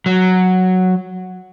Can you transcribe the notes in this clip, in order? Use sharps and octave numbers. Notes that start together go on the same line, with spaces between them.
F#3